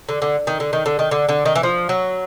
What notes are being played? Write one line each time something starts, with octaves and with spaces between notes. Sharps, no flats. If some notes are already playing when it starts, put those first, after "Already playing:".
D3
D3
D#3
D3
D#3
D3
D#3
D3
D3
D#3
E3
F3
F#3